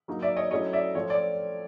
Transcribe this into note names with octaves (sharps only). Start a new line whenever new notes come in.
F#3 A#3 D#4
D5 E5
C#5 D#5
F#3 A3 C#4 E4 C#5 D#5
D5 E5
F3 A3 C4 F4 C#5
D5